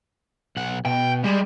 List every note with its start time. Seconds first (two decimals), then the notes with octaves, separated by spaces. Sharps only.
0.57 B1 F#5
0.85 B2 G5
1.24 G3 G#3